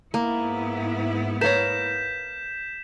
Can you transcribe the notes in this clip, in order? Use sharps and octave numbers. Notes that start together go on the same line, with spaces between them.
G#2 A#3 B3 E4
A#4 B4 C#5 F5 A#5 G6 B6 E7